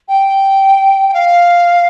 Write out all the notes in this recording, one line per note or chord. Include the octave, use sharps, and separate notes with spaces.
G5
G5
F5